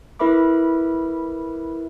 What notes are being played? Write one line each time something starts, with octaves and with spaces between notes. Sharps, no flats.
E4 A#4 B4 E5 B5 D6